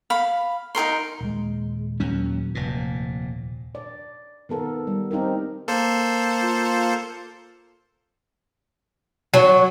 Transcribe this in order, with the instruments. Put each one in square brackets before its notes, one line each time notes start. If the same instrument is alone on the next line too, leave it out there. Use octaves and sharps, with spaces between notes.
[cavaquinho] F5 B5
D#4 G#4 A#4 C6
[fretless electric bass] D#1 G#3
[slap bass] D#2 F#3 C#4
F1 A#2
[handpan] D5
D#3 B3 A4 A#4
G3
C4 D#4 G4 A#4
[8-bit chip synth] A#3 A4 C5
[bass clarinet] F4
[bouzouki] F#3